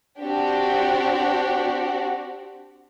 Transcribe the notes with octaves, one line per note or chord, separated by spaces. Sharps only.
C4 D4 F#4 G4